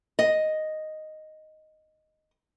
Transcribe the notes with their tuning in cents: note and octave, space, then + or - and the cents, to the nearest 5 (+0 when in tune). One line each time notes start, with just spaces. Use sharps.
D#5 +0